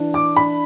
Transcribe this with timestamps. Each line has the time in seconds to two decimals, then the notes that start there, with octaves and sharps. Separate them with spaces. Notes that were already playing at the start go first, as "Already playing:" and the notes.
Already playing: E3 D4
0.14 D6
0.36 D4 B5